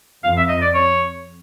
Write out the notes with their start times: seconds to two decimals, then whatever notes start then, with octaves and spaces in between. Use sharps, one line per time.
0.24 F2 F5
0.37 E5
0.48 D#5
0.61 D5
0.74 C#5